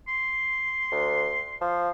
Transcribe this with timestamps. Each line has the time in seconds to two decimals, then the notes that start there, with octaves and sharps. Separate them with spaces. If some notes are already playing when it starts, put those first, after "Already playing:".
0.08 C6
0.92 D2
1.61 F3